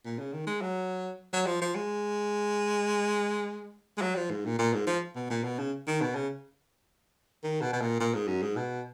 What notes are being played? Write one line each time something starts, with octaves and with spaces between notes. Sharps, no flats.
A#2
C#3
D#3
G#3
F#3
F#3
F3
F3
G#3
G#3
F#3
F3
G#2
A#2
A#2
G#2
F3
B2
A#2
B2
C#3
D#3
B2
C#3
D#3
B2
B2
A#2
A#2
G#2
F#2
G#2
B2